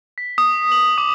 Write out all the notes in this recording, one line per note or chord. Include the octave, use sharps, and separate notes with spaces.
B6
D#6
F#7
D6